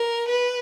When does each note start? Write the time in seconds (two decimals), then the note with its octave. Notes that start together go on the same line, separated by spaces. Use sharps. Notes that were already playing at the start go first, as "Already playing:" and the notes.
Already playing: A#4
0.28 B4